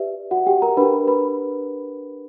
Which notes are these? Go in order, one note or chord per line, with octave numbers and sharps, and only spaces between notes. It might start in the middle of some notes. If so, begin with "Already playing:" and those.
Already playing: G4 B4 D5 E5
F#4 F#5
G4 G5
A#4 A#5
D4 G4 A#4 B4 B5
B4 B5